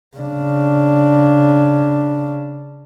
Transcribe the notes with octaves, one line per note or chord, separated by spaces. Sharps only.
C#3 D4